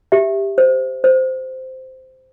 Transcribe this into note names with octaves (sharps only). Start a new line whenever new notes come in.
G4 E5
C5
C5